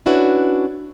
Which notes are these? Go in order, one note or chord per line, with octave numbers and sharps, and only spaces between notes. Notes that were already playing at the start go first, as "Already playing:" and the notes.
C#4 D4 E4 F#4 B4 C#5